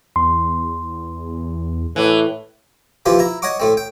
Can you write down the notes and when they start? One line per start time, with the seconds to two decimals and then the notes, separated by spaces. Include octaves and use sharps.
0.16 E2 C6
1.96 A2 E3
3.06 E3 F3 A#3 C4 F4 G4
3.19 E4 A#5
3.42 C#5 D#5 F#5 C#6 D6
3.60 A2 A3 C4
3.77 G5